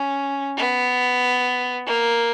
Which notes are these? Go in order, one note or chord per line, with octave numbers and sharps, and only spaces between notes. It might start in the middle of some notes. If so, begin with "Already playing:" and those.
Already playing: C#4
B3
A#3